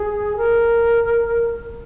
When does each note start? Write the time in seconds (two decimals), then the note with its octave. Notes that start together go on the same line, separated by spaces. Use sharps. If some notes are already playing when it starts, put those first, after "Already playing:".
Already playing: G#4
0.37 A#4